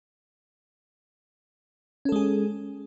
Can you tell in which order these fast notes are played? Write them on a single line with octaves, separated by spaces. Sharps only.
C#4 A4 G#3 G#4